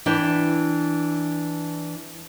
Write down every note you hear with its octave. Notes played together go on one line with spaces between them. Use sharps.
E3 D4 E4 G5